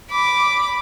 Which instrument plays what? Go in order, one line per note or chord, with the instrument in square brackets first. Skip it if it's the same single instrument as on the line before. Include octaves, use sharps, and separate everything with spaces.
[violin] B5 D6